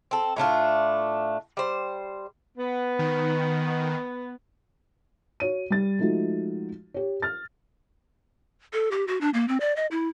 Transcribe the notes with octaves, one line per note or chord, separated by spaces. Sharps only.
C4 A4
A2 A3 D4 F4
G3 C5
B3
D#3
F#4 C#5 D#7
G3 A6
F3 G#3 A3 D#4 F#4
G4 C#5
F6 A6
A4
G4
F#4
D4
A#3
C4
D5
D#5
E4